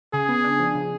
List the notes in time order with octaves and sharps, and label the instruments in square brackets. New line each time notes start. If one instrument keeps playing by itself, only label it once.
[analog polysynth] C#3 [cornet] G#4
[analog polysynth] B3
D4
F3
C#3